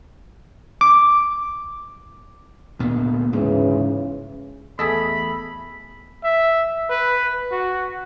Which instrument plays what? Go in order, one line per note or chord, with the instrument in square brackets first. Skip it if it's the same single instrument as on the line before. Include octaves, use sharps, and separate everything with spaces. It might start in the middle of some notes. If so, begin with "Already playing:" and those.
[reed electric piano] D6
[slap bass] D2 A#2 B3
[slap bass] D2 G#2 [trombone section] C#3 E3
[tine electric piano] E2 A3 E6 [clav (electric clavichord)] G#4 A4 D#5 [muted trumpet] B5
[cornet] E5
B4
F#4